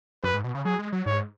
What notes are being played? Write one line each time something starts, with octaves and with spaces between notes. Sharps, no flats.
F#2 B4
G#2
B2
C#3
F#3 G#4
G#3
F#3
G#2 C#5